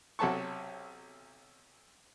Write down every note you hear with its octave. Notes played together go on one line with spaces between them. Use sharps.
B1 C3 F#3 A4 A5 C#6